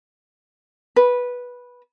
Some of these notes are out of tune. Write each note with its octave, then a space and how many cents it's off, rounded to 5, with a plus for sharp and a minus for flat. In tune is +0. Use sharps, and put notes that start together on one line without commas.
B4 -10